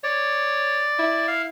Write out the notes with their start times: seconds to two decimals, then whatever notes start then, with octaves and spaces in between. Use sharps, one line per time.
0.04 C#5 D5
0.99 E4
1.28 F5